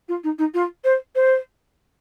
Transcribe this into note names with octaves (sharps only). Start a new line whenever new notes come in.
F4
D#4
D#4
F4
C5
C5